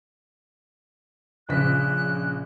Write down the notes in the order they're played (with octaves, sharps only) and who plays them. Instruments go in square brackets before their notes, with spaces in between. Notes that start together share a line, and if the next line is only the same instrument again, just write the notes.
[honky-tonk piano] A#1 C#3 B6 [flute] F#6